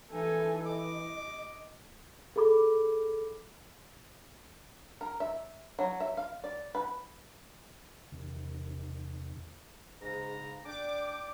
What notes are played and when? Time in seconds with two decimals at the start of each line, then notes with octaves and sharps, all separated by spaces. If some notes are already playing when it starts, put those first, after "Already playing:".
0.12 E3 D#4 A4 G#5
0.66 D#5 D6
2.36 G#4 A4 B5 D6
5.01 A#4
5.20 E5
5.79 F#3
6.00 E5
6.17 F5
6.44 D5
6.75 B4
8.12 E2 C3 D#3
10.02 G#2 C#3 A#5
10.65 D4 D5 G5 D6